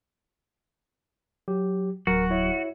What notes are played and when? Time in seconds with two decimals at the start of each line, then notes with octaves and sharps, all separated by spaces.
1.48 F#3 G4
2.07 D1 F#3 F#4 A#4
2.30 E4 C#5 E5